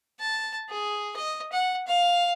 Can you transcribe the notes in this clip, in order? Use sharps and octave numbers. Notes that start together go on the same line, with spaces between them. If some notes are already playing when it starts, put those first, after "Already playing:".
A5
G#4
D#5
F#5
F5